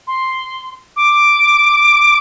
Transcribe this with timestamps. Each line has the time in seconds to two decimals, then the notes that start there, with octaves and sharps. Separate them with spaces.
0.07 C6
0.96 D6